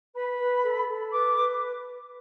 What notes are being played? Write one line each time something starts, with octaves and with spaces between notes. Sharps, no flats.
B4 B5
B4
A4
A4
B4 D6
B4